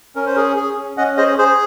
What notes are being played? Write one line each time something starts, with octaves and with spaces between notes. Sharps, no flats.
C#4 A#4
C5
G#4 A#4
G#4
C#4
C#4 D#5 F#5
G#4 C5 D#5
G#4 C5